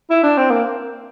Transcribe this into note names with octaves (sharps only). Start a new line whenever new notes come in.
E4
D4
C4
A#3